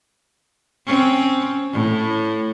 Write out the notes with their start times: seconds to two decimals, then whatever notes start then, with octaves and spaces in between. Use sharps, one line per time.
0.86 C4 C#4
1.73 A2